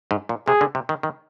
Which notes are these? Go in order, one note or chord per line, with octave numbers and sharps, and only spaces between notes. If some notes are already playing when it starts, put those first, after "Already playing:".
G#2
A#2
C3 G#4
D3
C3
D#3
D#3